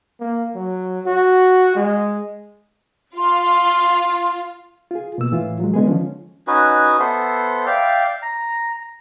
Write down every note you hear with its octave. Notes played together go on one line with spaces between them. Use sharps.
A#3
F#3
F#4
G#3
F4 C6
F4 G#4
B2 A#3 E6
A2 E3 F4
F#3 G#3
D3 G#3 B3 G#4
D#3 F3 C#4
C#4 D#4 F#4 B4
B3 A4 C5 E5
D5 E5 F5 G5
A#5